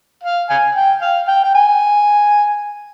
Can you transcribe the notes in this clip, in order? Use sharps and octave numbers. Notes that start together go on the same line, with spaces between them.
F5
F5 G#5
G5
F5
G5
G5
G#5